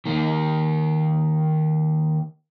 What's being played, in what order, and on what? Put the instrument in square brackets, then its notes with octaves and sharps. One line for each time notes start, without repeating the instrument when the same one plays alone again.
[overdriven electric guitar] D#3 A#3